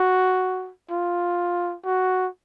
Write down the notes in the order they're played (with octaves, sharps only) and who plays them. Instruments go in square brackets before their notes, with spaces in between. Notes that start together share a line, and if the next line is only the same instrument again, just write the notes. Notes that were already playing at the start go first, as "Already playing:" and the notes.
Already playing: [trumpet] F#4
F4
F#4